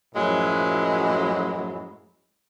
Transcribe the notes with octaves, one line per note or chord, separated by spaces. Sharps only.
F#2 A2 F3 F#3 G#3 E4